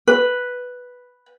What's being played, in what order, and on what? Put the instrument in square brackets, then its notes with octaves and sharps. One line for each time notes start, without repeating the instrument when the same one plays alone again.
[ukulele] B4